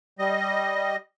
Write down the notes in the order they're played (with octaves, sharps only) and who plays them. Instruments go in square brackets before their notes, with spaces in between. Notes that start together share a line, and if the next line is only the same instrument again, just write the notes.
[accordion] G3 D#5